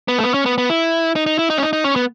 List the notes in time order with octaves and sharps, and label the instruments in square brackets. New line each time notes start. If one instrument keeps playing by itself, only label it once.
[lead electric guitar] B3
A3
B3
C#4
B3
B3
E4
D#4
D#4
E4
D#4
C#4
D#4
D#4
C#4
B3